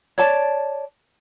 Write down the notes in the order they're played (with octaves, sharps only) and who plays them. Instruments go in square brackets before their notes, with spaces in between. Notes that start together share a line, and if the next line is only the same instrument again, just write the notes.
[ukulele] C#5 D5 A5